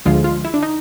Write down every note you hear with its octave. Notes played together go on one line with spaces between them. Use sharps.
D2 D3 F3 G#3 F4
F4
E4
D4
D#4